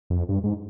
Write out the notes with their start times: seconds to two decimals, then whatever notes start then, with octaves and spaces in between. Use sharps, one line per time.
0.10 F2
0.29 G2
0.44 G#2